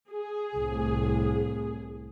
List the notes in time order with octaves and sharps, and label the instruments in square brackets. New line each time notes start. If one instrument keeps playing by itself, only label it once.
[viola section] G#4
[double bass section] C2 A2